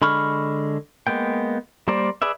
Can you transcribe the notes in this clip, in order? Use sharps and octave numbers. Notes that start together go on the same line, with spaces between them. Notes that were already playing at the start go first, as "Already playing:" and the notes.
D3 G#3 B5 C#6 F6
G#3 A#3 B3 G5
G3 A#3 A#4 C5 D5
G#4 B4 D5 E5